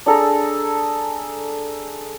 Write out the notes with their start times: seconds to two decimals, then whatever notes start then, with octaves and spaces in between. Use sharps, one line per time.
0.06 D4 G#4 A4 A#5